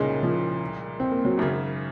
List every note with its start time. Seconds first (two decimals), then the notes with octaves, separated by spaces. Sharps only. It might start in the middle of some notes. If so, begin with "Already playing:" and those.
Already playing: C2 A#2 C#3 G#3 D#4 G#4
0.23 F3
1.00 C4
1.12 A#3
1.25 F#3
1.37 G#1 F#2 C#3